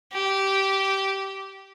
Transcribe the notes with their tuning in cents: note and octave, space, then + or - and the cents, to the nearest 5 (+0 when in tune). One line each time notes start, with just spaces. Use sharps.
G4 -15